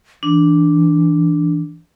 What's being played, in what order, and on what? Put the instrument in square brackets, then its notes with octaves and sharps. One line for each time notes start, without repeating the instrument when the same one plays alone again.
[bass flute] E3 [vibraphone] D4